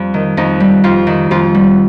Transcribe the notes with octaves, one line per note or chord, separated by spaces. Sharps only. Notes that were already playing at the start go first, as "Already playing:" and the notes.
Already playing: F2 G3
D#3
F2 D#4
G3
F2 F4
D#3
F2 F4
G3